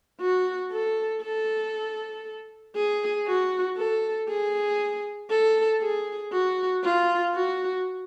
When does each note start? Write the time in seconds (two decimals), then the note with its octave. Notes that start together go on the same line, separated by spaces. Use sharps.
0.21 F#4
0.72 A4
1.23 A4
2.76 G#4
3.27 F#4
3.77 A4
4.28 G#4
5.30 A4
5.81 G#4
6.32 F#4
6.83 F4
7.34 F#4